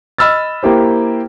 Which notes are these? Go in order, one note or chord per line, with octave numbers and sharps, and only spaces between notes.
D#5 B5 E6 F6 A6
A#3 E4 G4 C5